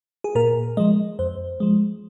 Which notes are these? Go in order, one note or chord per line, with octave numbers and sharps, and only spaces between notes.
G#4
A#2 A#4
F3 G#3 D#5
F2 C5
F3 G#3